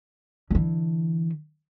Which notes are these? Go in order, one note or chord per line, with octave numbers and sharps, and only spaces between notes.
D3 E3